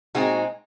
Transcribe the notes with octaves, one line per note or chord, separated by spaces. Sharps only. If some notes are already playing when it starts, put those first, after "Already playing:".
A#2 G#3 C4 D#4 F#4